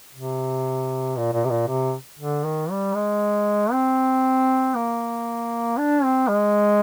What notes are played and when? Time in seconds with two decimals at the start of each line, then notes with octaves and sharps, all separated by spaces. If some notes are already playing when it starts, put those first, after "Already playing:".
0.15 C3
1.17 A#2
1.33 A#2
1.45 C3
1.50 A#2
1.67 C3
2.19 D3
2.45 D#3
2.71 G3
2.95 G#3
3.72 C4
4.75 A#3
5.78 D4
6.03 C4
6.28 G#3